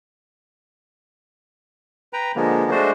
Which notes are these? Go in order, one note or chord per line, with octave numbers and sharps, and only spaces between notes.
B4 G5 A#5
D3 F3 G#3 A#3 B3
G#3 A3 D4 F#4 C5